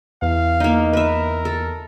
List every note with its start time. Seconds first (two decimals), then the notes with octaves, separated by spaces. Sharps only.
0.22 E2 F5
0.60 A#3 D#4
0.93 A#4 B4 E5
1.45 A4